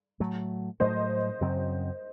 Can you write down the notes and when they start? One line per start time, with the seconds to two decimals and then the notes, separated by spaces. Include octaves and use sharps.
0.20 A2 F#3 A3
0.80 A2 F#3 A3 C5 D#5
1.41 F#2 C#3 F#3 C4